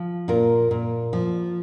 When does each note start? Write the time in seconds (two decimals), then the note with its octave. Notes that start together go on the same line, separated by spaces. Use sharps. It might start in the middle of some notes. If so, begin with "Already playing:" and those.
Already playing: F3
0.28 A#2 F4 A#4
0.71 A#2
1.13 F3